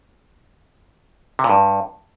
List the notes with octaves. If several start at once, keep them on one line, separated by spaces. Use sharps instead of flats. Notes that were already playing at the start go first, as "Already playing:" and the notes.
C3
A#2
G2